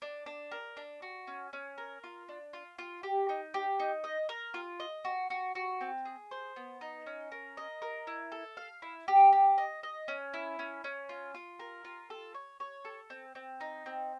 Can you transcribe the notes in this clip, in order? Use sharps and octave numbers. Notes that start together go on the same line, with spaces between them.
D4
D4
A#4
D4
F#4
C#4
C#4
A#4
F4
D4
F4
F4
G4
D#4
G4
D#4
D#5
A#4
F4
D#5
F#4
F#4
F#4
C4
G#4
C5
B3
D#4
C#4
A#4
D#5
A#4
E4
A4
F5
E4
G4
G4
D#5
D#5
C#4
E4
C#4
C#4
F4
F4
A#4
F4
A4
C#5
C#5
A4
C4
C4
D#4
C4